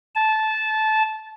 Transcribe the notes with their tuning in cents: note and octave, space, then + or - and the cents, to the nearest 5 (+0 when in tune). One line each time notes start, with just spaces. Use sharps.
A5 -15